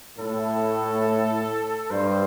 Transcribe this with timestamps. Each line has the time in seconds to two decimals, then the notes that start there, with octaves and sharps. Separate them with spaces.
0.19 A2 A4
1.90 G2 C5